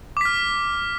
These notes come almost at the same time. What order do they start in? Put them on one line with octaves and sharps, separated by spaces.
D6 B6 F6